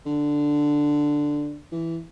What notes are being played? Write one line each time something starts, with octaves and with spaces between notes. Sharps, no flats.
D3
E3